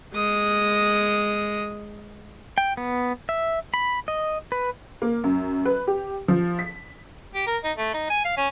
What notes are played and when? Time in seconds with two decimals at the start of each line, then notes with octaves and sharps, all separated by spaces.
0.14 G#3 D#6
2.58 G5
2.77 B3
3.29 E5
3.74 B5
4.08 D#5
4.52 B4
5.02 A#3
5.24 F#2
5.65 B4
5.87 G4
6.28 F3
6.59 B6
7.35 G4
7.47 A#4
7.64 D#4
7.77 A3
7.94 D#4
8.10 G#5
8.25 F5
8.37 C#4